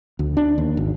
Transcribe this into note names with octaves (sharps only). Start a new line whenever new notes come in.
D2
D4
D#2
G#1